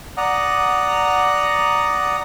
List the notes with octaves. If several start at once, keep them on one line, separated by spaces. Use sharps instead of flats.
D5 F#5 A#5 D#6